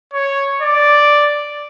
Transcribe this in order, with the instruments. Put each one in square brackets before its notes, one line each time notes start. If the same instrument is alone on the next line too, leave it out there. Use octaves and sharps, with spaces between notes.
[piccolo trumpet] C#5
D5